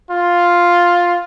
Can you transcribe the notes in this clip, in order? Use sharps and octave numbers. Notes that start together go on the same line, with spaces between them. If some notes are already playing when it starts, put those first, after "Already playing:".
F4